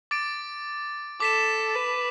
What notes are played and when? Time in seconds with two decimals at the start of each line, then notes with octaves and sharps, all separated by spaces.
0.11 D6 A6 D7
1.20 A4 D6 B6 E7
1.75 B4